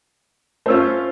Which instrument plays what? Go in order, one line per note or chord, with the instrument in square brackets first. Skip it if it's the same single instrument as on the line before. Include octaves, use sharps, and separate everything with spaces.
[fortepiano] A3 C#4 F4 [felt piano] C5 E6